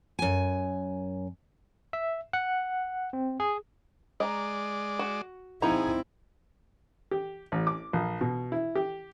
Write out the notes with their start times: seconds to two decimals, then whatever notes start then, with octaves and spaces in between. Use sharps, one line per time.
0.19 F#2 G#5
1.93 E5
2.33 F#5
3.13 C4
3.40 G#4
4.20 G#3 D5 D#5 A#5
4.99 F#4
5.62 F3 C4 D#4 E4 G#4 A#5
7.11 G4
7.52 A1
7.67 D6
7.93 A#1
8.21 B2
8.52 E4
8.75 G4